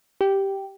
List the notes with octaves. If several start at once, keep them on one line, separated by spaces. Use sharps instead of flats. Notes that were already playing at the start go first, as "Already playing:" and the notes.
G4